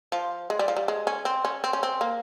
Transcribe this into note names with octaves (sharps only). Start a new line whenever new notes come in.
F3
G#3
G3
F3
G3
G#3
C#4
C4
C#4
C4
C#4
C4
A#3